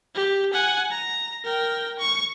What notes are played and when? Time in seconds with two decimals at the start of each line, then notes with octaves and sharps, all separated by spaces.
0.15 G4
0.54 F#5 G#5
0.91 A#5
1.44 A#4 G5
1.99 C#6